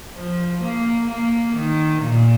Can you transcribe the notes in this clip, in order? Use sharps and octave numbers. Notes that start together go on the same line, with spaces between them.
F3
A#3
A#3
D#3
A#2